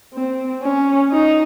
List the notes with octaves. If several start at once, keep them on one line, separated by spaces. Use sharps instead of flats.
C4
C#4
D#4